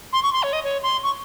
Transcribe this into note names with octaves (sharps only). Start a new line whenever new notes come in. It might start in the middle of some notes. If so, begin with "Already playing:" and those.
C6
C#6
C6
C#5
D#5
C#5
C6
C#6